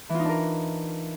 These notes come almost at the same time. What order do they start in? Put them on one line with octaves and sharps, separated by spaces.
E3 F4 D#4 D4 A#4